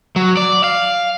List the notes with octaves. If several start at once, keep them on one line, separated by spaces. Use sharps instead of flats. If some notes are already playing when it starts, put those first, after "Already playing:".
F#3
D5
F5